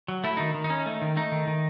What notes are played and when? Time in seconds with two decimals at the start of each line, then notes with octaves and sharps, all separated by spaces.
0.08 F#3
0.24 A3 E4
0.37 D#3 D#4
0.54 D#3
0.64 D#4
0.70 C#4
0.86 A3
1.02 D#3
1.17 A3 D#4
1.32 D#3
1.47 D#3